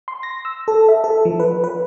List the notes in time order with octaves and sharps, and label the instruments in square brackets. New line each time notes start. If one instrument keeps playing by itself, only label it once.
[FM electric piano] C6
A#6
E6
A4
E5
A4
F3
B4
B4